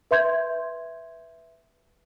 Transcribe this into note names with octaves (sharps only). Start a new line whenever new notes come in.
B4 E5 C6 G6 G#6